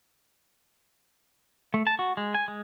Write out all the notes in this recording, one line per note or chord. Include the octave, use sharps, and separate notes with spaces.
A3
A5
F#4
G#3
G#5
G#3